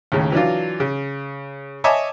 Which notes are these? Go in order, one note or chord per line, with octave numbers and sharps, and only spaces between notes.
D#2 A2 C#3
E3 F#3 D4 F4
C#3
C#5 D#5 E5 G#5 A5 D6